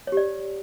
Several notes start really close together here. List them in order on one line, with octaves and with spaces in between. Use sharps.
C#5 G4 D5